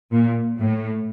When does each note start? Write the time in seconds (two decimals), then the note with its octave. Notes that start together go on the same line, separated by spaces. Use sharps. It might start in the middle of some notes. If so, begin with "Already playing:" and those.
0.11 A#2
0.58 A2